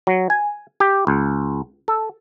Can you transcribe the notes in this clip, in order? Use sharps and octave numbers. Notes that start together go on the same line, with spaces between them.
F#3
G#5
G4
C#2
A4